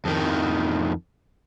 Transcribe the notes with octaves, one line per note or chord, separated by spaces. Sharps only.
F2 D#3